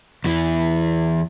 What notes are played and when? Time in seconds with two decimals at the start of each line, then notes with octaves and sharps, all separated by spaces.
0.24 E2 E3